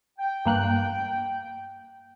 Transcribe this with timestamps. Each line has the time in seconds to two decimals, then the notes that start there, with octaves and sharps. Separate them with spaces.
0.19 G5
0.46 G2 A#3 F#6